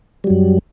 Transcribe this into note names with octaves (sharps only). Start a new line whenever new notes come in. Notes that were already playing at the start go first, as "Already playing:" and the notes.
F#2 F#3 G3